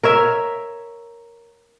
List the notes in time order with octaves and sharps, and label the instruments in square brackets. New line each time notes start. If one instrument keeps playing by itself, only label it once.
[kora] A#4 C#5 E5